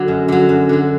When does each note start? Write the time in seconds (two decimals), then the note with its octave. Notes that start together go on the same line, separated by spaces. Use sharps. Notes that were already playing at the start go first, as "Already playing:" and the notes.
Already playing: D3 F#3
0.08 F#2
0.28 D3 F#3
0.49 F#2
0.69 D3 F#3